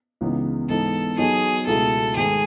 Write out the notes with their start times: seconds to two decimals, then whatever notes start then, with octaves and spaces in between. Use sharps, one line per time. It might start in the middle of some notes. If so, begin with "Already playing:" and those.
0.21 C#2 C#3 E3 B3 D#4
0.69 G#2 E3 B3 D#4 A4
1.18 F#3 B3 D#4 F#4 G#4
1.67 C#2 B2 A3 E4 G#4 A4
2.16 G#2 D#3 A3 G#4